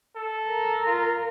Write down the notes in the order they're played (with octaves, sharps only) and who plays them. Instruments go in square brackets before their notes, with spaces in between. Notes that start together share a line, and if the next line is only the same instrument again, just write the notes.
[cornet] A4
[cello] A#4
[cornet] F4